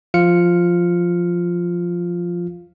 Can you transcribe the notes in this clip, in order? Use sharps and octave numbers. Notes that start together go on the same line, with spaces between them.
F3 F4 F5 F6 C#7